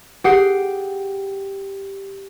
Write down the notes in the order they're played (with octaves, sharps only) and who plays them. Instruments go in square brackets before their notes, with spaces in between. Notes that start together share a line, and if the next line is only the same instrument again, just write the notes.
[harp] G4 C7 [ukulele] G#4 F#5